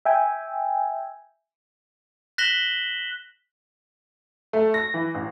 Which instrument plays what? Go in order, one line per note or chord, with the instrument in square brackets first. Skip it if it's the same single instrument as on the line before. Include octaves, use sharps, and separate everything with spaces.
[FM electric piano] E5 G5 G#5
[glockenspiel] F#6 A#6 B6 E7 F#7 G7
[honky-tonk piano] A3
A#6
E3
A1